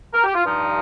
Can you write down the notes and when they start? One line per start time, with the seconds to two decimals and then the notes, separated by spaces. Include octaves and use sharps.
0.14 A#4
0.24 G4
0.34 F4
0.44 G2 F3 D#4